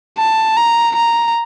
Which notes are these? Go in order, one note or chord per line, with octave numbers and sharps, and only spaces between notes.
A5
A#5
A#5